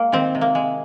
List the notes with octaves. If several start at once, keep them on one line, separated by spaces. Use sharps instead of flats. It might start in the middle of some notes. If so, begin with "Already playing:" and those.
Already playing: G#3 A#3
D#3 C4
C3
A#3
G#3